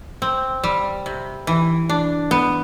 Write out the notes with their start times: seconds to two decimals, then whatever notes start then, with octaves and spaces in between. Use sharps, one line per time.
0.22 C4
0.64 G3
1.06 C3
1.47 E3
1.89 D4
2.31 B3